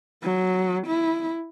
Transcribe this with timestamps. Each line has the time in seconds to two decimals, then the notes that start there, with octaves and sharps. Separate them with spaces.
0.23 F#3
0.87 E4